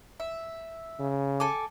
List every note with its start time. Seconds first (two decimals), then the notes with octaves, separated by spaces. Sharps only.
0.20 E5
0.99 C#3
1.40 A4 G#5 D6